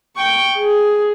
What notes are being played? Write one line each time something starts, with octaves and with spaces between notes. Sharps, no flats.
G5 C#6
G#4